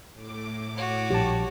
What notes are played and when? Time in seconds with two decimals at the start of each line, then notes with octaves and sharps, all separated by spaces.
0.14 A2 D6
0.77 F#4 C#5
1.10 A#1 G4 A5